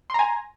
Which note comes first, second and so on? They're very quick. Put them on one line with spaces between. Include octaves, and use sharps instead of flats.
C6 A#5 G#5